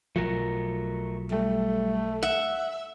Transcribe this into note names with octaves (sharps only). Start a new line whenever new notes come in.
B1 F3 A3 F#4 A#4
G3 A3
E5 F#5